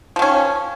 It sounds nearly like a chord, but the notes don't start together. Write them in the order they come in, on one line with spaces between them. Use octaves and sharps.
F3 D#3 C#4